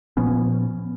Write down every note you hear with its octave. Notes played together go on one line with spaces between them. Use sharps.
A#2 F3 B3 C#4